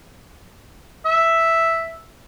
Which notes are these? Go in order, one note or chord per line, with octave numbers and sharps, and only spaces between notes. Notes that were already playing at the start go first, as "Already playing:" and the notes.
E5